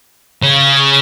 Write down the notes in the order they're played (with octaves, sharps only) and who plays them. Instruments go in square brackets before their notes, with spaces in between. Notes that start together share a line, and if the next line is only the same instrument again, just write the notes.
[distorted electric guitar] C#3